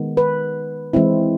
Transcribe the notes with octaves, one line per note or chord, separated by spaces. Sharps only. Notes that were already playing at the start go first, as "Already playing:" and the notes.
Already playing: D#3 G#3 B3
B4
E3 G#3 C4 E4